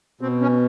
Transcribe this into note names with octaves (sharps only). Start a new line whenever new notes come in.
B2 C4
C#4